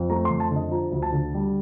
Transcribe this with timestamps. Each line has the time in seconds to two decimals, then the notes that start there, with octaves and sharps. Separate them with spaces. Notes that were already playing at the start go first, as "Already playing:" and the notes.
Already playing: F2
0.10 A3 A#5
0.25 C6
0.30 F2
0.40 A5
0.51 D3
0.56 D#5
0.71 F3 A#5
0.92 D2
1.02 A5
1.12 D3
1.34 G3